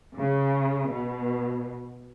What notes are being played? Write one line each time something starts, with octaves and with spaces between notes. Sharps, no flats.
C#3
B2